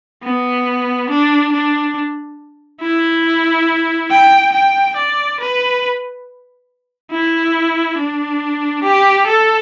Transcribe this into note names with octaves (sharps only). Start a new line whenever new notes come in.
B3
D4
D4
E4
G5
G5
D5
B4
E4
D4
G4
A4